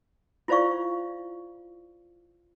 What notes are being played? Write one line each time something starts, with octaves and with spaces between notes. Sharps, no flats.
E4 F4 C5 D5 F5 C#6